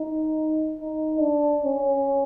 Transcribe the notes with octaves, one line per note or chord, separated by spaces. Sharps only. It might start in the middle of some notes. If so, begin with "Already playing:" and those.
Already playing: D#4
D#4
D4
C#4